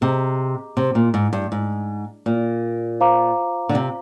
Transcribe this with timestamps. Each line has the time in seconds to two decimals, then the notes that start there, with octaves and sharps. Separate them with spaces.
0.01 C3 G#4 D#5 A#5 D6
0.77 C3
0.95 A#2
1.14 G#2
1.33 G2
1.52 G#2
2.26 A#2
3.00 F4 C5 F5 A#5 D6
3.69 D3
3.75 C3